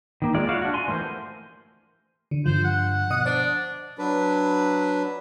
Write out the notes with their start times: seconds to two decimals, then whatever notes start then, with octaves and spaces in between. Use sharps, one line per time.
0.22 D#3 A#3
0.34 G#3 F4 D5
0.49 E4 F#4 C#5 F5
0.62 D4 F#4
0.74 G#5 C6
0.88 E3 A3 G4 A#4 C5
2.31 D3
2.46 G2 D3 F3 C5
2.64 F#5
3.10 B2 D#5 D#6
3.26 D4 C5 D5
3.98 F#3 D4 B4